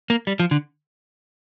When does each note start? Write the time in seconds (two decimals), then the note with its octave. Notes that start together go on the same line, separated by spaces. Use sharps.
0.10 A#3
0.27 G3
0.40 F3
0.51 D3